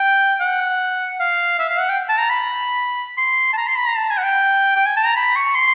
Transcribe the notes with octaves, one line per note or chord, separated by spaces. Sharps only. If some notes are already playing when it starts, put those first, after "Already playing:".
Already playing: G5
F#5
F5
E5
F5
F#5
G5
A5
A#5
B5
C6
A5
A#5
C6
B5
A#5
A5
G#5
F#5
G5
G5
G#5
A5
A#5
B5
C#6
C6